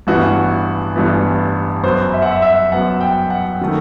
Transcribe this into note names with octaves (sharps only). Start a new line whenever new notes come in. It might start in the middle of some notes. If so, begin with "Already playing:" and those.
A1 G2 E3 B3 F#4
A1 G2 E3 B3
F#2 F#3 B3 C5
E5
F#5
E5
E5
F#2 F#3 B3 F#5
G5
F#5
D#3 F#3 A3